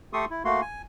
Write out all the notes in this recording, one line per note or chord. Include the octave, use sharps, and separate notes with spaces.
A3 G4 A4 C6 C#6 D#6
E4
A3 A#3 F#4 C6
G#5